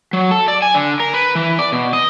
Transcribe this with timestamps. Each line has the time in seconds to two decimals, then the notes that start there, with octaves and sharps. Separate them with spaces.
0.13 F#3
0.31 A4
0.48 D5
0.62 G#5
0.75 D3
1.00 A#4
1.14 B4
1.35 E3
1.59 D5
1.72 B2
1.93 D#5